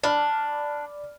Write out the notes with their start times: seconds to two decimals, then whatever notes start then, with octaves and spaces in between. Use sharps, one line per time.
0.03 D4 D5 B5 F6